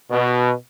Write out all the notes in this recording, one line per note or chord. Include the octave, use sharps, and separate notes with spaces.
B2